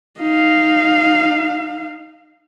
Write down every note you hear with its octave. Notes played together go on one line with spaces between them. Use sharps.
D#4 F5